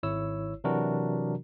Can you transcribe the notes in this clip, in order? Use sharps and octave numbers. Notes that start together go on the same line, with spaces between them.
G#1 E4 C#5 E6
C3 E3 F#3 D4 F#4 A#4